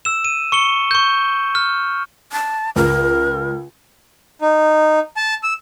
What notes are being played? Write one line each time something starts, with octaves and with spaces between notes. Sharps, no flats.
E6 E7
D#7
C#6 C#7 G7
C#6 G6
F6
A5
C#2 A#4
D#4
A5
E6